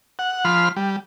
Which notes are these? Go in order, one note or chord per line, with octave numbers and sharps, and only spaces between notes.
F#5
F3 B5 C6 F6
G3